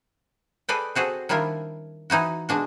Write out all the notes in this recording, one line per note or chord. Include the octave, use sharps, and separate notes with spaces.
G#4 A4 B4 D5 D#5 G5
C4 F#4 G#4 A4
D#3 G3 D4 E4 F4 A#4
E3 D#4 E4 F#4
B2 G#3 D4 F#4